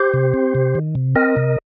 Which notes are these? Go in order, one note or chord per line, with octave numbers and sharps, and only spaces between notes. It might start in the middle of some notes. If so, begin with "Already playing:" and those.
Already playing: G4 C5
C3
C4
C3
D#3
C3
C4 A#4 D#5
C3